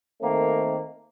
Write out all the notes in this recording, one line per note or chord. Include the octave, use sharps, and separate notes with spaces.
D#3 A3 A#3 C4